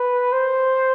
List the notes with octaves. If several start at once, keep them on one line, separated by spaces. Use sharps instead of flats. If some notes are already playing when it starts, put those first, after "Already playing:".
Already playing: B4
C5